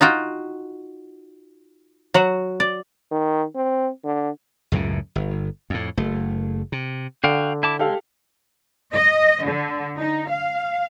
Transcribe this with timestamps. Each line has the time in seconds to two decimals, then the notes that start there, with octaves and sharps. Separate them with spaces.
0.01 D#4 F4 F#4 G5
2.14 F#3 F#4 F#5
2.60 D5
3.11 D#3
3.55 C4
4.04 D3
4.72 C#2 F#2 A2 C#3
5.15 G1
5.70 F2 A2
5.97 F#1 A3
6.72 C3
7.24 D3 F#4 F5 G5
7.63 E4 A5 D6
7.79 G#3 G4 A4 F5
8.93 D#5
9.43 D3
9.97 D#4
10.30 F5